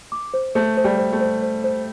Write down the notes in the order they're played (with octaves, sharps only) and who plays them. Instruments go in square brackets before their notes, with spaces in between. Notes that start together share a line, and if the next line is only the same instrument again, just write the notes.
[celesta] D6
C5
[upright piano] A3 [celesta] C5
[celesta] C5
[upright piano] G3
[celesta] C5
[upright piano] A3
[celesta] C5
C5
C5